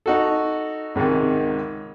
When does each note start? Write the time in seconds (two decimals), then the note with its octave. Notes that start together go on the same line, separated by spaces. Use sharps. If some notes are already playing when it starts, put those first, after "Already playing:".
0.06 D#4 F#4 A4
0.95 C#2 G#2 C3 D#3